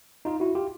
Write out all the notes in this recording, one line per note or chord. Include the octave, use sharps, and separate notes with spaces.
D#4 F4
E4 F#4
F4 G4